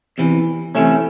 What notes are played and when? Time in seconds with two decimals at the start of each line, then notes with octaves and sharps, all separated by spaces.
0.18 E2 C3 E3
0.75 C3 E3 A3 C#4